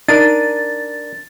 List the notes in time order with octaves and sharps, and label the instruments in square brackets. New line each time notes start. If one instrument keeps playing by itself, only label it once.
[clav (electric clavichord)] D4 A#4 [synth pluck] D#4 D#7 [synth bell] A6